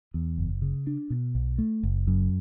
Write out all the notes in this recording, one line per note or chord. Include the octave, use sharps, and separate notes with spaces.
E2
F#1
C#3
D4
B2
B1
A3
F#1
F#2